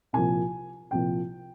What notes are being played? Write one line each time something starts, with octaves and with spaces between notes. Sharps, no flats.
C2 A#2 F3 G#5
C2 A#2 F3 G5